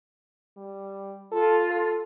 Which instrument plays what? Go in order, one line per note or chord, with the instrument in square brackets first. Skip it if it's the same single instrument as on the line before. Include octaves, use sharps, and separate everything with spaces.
[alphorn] G3
[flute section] F4 [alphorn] A4
[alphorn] A4